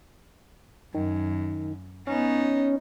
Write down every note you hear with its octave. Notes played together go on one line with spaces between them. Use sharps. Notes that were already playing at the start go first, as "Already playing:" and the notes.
F#2 D#3
B3 C#4 D#4